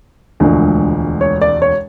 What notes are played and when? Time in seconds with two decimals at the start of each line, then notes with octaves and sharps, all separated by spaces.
0.40 E1 D2 D3 F3 G#3
1.21 C#5
1.41 D5
1.62 C#5